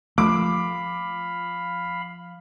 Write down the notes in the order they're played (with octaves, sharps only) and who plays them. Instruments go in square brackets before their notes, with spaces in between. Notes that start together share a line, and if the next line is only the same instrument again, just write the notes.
[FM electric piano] F3 [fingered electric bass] A3 [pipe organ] F5 B5 [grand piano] D6